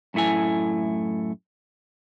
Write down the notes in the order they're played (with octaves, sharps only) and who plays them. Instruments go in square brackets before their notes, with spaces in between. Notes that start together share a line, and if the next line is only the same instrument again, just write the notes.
[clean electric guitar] F#2 A2 A3 E4 G#5